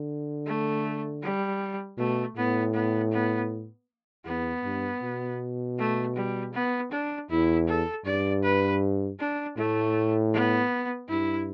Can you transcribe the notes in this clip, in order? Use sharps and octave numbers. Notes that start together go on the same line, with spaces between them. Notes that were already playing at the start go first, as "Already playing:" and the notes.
Already playing: D3
A3
G3
B2 A3
A2 B3
B3
B3
E2 B3
G2
B2
A3
G3
B3
D4
E2 E4
A4
G2 D5
B4
D4
A2 A3
B3
G2 E4